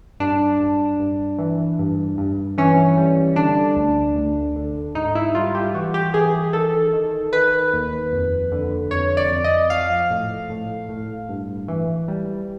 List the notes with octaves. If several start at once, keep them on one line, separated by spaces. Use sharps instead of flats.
G2 D4
G2
G2
E3
G2
G2
E3 C#4
G3
D3 D4
D2
D2
D3
G#2 D#4
E4
G3 F4
G4
E3 F#4
G4
E3 G#4
D#3 A4
D#3
D#3 B4
D#2
F2
D3
F2 C#5
D5
F2
D#5
F3 F5
A2
A2
A2
G2
E3
G3